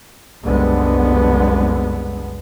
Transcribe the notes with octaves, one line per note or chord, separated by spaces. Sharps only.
F#1 C2 F#2 D3 G#3 B3